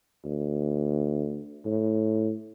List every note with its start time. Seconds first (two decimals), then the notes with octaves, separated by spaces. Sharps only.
0.25 D2
1.65 A2